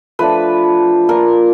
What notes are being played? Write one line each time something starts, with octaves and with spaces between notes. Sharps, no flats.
F3 A3 D4 B4
A#3 D4 F4 A#4